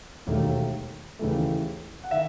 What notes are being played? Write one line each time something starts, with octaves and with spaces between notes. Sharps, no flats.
E1 D#2 D#3 A3
D#2 C#3 E3 A3
F#5
D#3 E5